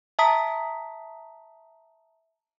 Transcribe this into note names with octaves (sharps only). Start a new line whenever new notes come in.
E5 A5 A#5 D#6 B6